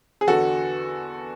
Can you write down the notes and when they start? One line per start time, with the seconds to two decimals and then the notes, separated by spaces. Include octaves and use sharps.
0.21 G#4
0.27 E2 D3 F#4 A4